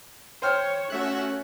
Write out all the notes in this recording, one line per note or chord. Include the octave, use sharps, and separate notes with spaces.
C5 C#5 G5 F6
A3 C#4 F#4 E5 F#6